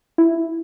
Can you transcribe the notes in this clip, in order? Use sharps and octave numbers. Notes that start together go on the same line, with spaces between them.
E4